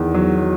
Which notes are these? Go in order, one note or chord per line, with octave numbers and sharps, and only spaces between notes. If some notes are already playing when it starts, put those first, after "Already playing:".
Already playing: E2 D#3
F#3